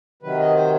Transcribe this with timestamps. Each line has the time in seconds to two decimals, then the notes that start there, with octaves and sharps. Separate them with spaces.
0.23 C3 D#3 F#3 B4
0.39 D#5
0.56 C5